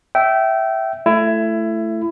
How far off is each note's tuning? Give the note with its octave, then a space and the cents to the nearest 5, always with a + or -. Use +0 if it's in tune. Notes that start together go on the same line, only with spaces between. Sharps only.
E5 +0 G5 -25
A3 +0 E4 +20